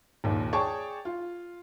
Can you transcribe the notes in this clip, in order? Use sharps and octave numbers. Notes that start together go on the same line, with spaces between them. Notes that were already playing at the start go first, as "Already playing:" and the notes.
A#1 D#2 A#2
G#4 C#5 D5 G5 A5 C#6
F4